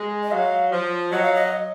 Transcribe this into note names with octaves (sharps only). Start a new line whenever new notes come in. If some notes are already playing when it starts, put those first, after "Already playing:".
Already playing: G#3
D#5
F#3 F5
F3
F#3 D#5
F5
D#5